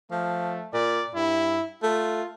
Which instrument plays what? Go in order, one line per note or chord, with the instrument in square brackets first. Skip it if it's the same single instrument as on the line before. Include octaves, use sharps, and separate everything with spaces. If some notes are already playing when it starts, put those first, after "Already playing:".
[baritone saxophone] F3 [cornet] A3
[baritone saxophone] A#2 [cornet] D5
[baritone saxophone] G2 [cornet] E4
[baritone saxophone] A3 [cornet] F4